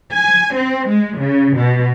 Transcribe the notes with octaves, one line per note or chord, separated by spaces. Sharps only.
G#5
C4
G#3
C#3
B2